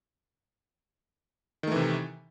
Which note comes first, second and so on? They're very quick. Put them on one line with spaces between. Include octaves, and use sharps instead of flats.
D#3 A3 E3 C3